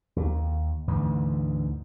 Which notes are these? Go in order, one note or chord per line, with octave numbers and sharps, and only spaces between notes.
D#2
D2 G#2 E3